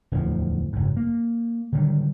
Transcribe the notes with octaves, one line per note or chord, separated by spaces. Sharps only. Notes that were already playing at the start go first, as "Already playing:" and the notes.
D1 E2 D3 F3
F#1 G#2
A#3
D3 D#3 F#3 G3